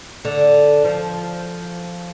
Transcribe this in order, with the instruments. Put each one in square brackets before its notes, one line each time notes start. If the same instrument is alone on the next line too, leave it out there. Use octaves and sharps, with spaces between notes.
[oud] D3
F3